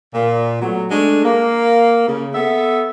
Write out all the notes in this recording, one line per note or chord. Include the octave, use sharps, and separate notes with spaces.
A#2
F#3 A3 B3
G#3 A3 D4
A#3
C#3
B3 A4 E5